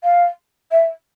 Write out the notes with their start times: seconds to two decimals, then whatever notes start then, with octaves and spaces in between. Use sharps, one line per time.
0.03 F5
0.71 E5